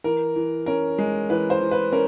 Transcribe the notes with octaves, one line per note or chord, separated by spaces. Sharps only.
E3 A#4
E3
C#4 A#4
G#3
E3 B4
C5
E3
B4
C#4 A#4